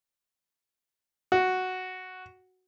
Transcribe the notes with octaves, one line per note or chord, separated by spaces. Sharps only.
F#4